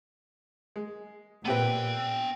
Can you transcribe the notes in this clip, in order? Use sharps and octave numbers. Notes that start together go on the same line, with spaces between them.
G#3
A#2 B3 C4 G4 B4 G5